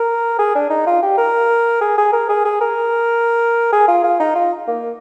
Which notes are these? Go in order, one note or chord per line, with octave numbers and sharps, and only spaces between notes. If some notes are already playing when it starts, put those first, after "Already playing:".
Already playing: A#4
G#4
D4
D#4
F4
G4
A#4
G#4
G#4
A#4
G#4
G#4
A#4
G#4
F4
F4
D#4
F4
A#3